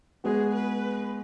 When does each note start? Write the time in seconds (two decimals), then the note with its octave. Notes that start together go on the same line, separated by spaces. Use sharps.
0.24 G#3 B3 F#4 G#4
0.54 B4